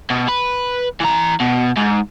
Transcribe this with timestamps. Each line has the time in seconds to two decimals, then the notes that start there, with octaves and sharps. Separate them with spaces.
0.10 B2
0.28 B4
1.01 E3 A#5
1.41 B2
1.77 G#2